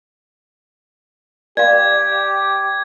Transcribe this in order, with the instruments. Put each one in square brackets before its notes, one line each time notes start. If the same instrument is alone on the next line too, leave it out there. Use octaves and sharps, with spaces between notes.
[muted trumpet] G4 [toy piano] D5 F5 [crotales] G#6